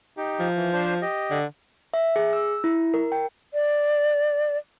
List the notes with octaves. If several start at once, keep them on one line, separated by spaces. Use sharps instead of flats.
D#4 G4
F3
E3
D4 C5
G4 D#5
D3
E5
G#4
E6
E4
A#4
G5
D5